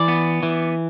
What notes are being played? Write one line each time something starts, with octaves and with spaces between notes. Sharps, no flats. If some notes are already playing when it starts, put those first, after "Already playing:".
Already playing: E3 D5
B3
E3